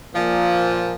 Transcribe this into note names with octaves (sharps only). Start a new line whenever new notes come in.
A#2 F3